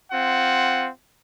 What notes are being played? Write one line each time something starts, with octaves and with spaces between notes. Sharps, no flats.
C4 F4 F#5